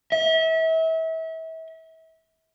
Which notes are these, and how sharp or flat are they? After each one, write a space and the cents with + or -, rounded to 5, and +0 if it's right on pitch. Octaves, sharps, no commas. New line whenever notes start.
E5 -35